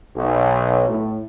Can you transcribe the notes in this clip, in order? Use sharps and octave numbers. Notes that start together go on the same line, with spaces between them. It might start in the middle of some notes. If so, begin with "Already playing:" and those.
B1
A2